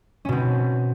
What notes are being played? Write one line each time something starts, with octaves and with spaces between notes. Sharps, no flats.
B2 C4 C#4